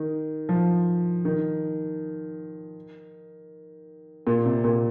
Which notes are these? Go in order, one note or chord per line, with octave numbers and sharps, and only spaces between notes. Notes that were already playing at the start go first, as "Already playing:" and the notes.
Already playing: D#3
F3
D#3
A#2
C3
A#2